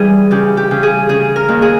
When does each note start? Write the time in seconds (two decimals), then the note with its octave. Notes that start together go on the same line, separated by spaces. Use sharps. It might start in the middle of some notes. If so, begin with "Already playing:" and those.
Already playing: E3 G3 G#4 B4
0.31 C#3 G4
0.57 G4
0.71 C#3
0.83 G#4
1.09 C#3 G#4
1.36 A#4
1.48 D#2
1.62 G#4